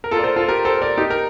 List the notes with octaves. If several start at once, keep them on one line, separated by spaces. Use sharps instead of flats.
A#4
F4 A4
D5
A4 C5
F4 A4
G4 A#4
A4 C5
A#4 D5
D#4 G4
A#4